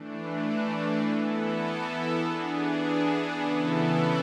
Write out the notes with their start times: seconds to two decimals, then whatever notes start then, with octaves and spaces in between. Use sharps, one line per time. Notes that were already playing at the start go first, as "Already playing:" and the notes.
Already playing: E3 A3 D4
1.02 E3 B3 E4 A4
2.20 E3 B3 D4 G#4
3.37 C#3 E3 B3 E4 A4